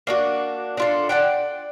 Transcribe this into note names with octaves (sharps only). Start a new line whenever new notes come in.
A#3 D4 F#4
D4 F4 A4
D5 F#5 G5